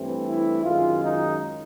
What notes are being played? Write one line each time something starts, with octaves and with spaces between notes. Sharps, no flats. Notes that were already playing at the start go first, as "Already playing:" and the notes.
Already playing: G2 E3 A3 C4
E4
F#2 D#3 G#3 F4
D#4